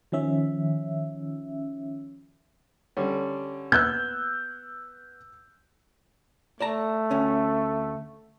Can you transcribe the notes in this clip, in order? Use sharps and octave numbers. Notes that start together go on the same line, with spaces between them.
D#3 F3 C#4 E5
D3 G3 C#4
B3 B4 E6 F#6 G6
A3 D5 A5 A#5
D2 C#4